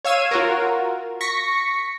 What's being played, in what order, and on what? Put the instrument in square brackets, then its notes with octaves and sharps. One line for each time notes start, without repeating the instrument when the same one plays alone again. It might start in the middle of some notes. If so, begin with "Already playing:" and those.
[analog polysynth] C#5 F5 E6 G#6 D#7
F4 F#4 A#4
C#6 A#6 B6 C#7